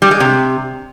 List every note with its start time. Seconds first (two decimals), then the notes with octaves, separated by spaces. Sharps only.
0.02 G3
0.11 G#3
0.20 C3